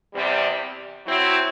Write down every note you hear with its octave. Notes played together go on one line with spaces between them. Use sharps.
E2 C3 G3
F#3 C4 E4